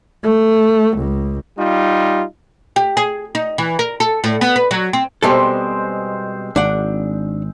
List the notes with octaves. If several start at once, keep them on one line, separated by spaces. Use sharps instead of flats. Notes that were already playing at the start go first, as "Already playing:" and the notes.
A3
C#2
G3 D#4 F4
G4
G#4
D#4
E3
A#4
A4
A2
B3
B4
F#3
C4
B2 G3 G#3 C4 A4 C5
G#1 D4 F#5